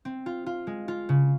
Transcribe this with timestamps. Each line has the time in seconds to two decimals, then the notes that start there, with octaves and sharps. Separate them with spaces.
0.05 C4
0.26 F4
0.46 F4
0.67 G#3
0.88 F4
1.09 C#3